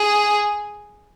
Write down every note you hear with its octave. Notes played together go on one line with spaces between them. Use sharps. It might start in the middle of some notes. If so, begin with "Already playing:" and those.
Already playing: G#4